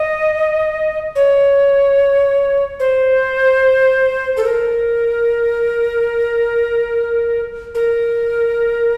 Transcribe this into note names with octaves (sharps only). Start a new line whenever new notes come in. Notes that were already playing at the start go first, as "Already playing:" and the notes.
Already playing: D#5
C#5
C5
A4
A#4
A#4